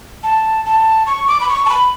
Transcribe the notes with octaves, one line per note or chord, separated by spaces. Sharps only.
A5
A5
C#6
D6
B5
C#6
A5
B5